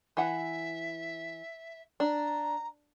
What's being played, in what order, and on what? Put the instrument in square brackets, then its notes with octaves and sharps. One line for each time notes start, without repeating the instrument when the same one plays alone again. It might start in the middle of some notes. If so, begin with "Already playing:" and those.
[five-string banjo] E3 F#5 [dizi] E5
[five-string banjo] D4 [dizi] A#5